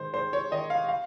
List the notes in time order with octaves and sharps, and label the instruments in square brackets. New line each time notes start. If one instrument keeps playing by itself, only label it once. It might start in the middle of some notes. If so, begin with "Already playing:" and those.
Already playing: [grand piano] G#2 D#3 C5
G#2 C5
C#5
D#3 D#5
F5
F5